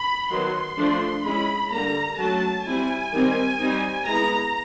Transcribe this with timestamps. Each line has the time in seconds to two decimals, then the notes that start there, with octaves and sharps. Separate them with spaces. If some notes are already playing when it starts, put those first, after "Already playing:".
Already playing: B5
0.30 D#3 F#3 B3 C6
0.78 F3 A3 D4
1.25 G#3 C#4 E4 B5
1.72 D3 G3 A#3 A#5
2.18 F#3 A3 C#4 A5
2.65 G3 C4 E4 G#5
3.12 D#3 G3 C4 D#4
3.60 G3 C4 D#4
4.06 G#3 B3 E4 A#5